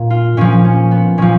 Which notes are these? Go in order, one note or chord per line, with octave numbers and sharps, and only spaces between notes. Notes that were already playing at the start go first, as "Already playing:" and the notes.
Already playing: A#2
F4
A#2 F3 C#4
C#4
B3
A#2 F3 C#4